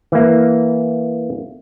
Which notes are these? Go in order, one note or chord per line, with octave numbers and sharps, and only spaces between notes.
E3 A#3